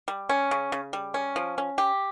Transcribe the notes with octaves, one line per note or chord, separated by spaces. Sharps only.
G3
C#4
C#3
C#3
G3
C#4
F3
C#4
G4